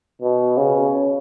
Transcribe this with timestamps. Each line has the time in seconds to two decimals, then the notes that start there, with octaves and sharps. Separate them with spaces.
0.22 B2
0.57 C#3